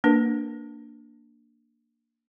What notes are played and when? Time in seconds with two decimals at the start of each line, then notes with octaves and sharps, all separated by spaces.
0.04 A#3 D4 A#4 B4